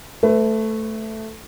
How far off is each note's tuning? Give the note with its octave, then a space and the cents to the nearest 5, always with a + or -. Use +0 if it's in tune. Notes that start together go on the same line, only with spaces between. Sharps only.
A3 +0 B4 +30